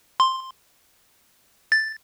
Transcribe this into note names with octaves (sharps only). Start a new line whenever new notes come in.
C6
A6